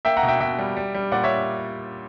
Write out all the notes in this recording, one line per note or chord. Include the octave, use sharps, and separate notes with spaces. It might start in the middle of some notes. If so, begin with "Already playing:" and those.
A#3 E5 G5
F#5 A#5
B2
E5 G5
B2 E5 G5
G3
G3
G3
A#2 D5 F#5
C#5 E5